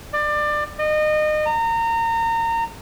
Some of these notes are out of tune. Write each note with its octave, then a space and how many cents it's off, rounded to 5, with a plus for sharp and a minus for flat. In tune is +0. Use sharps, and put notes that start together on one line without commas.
D5 +25
D#5 -30
A#5 -30